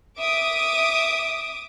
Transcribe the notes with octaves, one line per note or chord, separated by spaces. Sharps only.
E5 D6 D#6